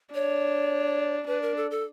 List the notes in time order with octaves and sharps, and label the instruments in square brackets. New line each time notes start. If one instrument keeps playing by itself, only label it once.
[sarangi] D4 [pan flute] C#5
[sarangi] D4 [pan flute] B4
[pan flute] A#4
A4
A4